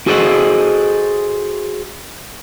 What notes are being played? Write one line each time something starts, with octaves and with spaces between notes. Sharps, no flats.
F#4 G#4 A4 C5 D#5 F#5